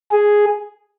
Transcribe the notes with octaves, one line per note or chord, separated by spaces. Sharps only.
G#4